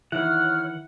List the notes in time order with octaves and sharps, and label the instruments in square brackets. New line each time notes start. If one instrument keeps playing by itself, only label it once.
[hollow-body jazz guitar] D#3 E3 [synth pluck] E4 [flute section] C#5 F6 [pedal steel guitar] F#5